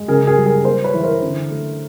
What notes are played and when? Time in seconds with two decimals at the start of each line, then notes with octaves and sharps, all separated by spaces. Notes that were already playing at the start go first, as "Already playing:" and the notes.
Already playing: G#3
0.08 C#3 G#4 A#4
0.27 G#4 A#4
0.37 G3
0.46 G#4 A#4
0.65 A#3 A#4 C5
0.84 B4 C#5
0.94 E3
1.04 A#4 C5
1.22 D3
1.51 A3